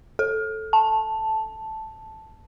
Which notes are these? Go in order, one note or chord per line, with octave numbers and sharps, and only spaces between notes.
A4
A5